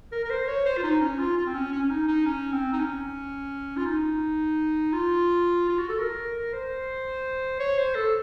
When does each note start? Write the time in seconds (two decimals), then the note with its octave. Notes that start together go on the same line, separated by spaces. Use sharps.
0.12 A#4
0.24 A#4
0.30 C5
0.48 C#5
0.66 C5
0.77 F4
0.83 D#4
1.01 C#4
1.19 F4
1.37 F4
1.46 C4
1.54 C#4
1.72 C#4
1.83 C#4
1.90 D#4
2.08 D#4
2.26 C#4
2.52 C4
2.73 D#4
2.79 C#4
3.77 F4
3.86 D#4
4.93 F4
5.69 F4
5.79 F#4
5.89 A4
5.99 A#4
6.53 C5
7.60 C#5
7.78 C5
7.95 A4